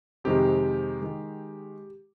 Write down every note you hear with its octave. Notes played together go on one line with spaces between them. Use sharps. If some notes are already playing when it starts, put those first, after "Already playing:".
F2 C3 D#3 G#3 G4
D#3 G#3